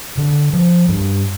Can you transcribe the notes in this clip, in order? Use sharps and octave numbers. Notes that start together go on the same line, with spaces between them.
D3
F3
G2